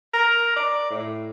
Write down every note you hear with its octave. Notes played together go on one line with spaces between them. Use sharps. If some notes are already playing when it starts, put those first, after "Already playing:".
A#4
D5
A2